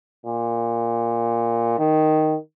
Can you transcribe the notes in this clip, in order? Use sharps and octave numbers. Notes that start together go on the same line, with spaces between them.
A#2
D#3